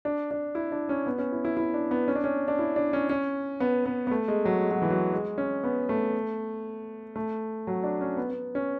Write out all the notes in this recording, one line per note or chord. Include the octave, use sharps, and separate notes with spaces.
D4
D4
E4
D4
C#4
B3
C#4
E4
E4
E4
D4
B3
C#4
D4
C#4
D4
E4
D4
C#4
C#4
B3
B3
B3
A3
G#3
F#3
G#3
F#3
E3
F#3
G#3
C#4
B3
A3
A3
F#3
D4
C#4
B3
B3
C#4